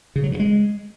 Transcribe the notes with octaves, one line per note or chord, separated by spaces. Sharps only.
C#3
F#3
G2
G#3